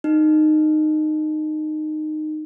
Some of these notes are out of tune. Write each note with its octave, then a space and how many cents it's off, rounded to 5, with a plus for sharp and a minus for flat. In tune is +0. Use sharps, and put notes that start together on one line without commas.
D#4 -15